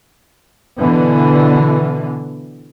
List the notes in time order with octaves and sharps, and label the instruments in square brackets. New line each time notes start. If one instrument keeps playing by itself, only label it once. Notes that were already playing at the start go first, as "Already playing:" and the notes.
[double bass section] B2 D3 E3